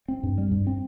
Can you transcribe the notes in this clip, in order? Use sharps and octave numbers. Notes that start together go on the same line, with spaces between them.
C4
G2
G3
G2
C4